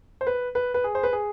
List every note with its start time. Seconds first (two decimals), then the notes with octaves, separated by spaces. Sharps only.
0.21 C5
0.27 B4
0.55 B4
0.74 B4
0.84 G#4
0.95 C5
1.03 B4
1.13 G#4